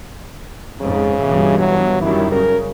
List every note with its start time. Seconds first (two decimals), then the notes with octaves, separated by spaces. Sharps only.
0.81 F2 G#2 C#3
1.21 G2 B2 E3
1.60 F#3
2.02 F#2 D#3 G3 E4
2.32 C#3 A#4